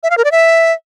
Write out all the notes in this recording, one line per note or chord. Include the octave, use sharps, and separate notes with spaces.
E5
F5
A#4
D5
E5